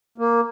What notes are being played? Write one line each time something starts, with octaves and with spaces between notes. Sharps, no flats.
A#3